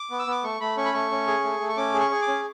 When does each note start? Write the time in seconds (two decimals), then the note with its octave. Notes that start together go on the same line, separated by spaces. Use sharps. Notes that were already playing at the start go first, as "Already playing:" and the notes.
Already playing: D6
0.10 B3
0.19 E6
0.27 B3 D6
0.44 A3 C#6
0.61 A3 B5
0.77 C#4 C#6
0.85 B5
0.94 A3 C#6
1.11 C#4
1.27 G#4
1.44 A3
1.60 A3
1.69 C#6
1.77 C#4 D6
1.94 G#4
2.00 C#6
2.11 G#4
2.22 D6
2.28 C#4